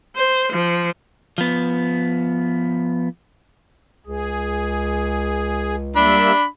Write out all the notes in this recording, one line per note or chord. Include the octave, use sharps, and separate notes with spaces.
C5
F3
F3 B3
C#2 G#4
G3 A#3 D4 E5 B5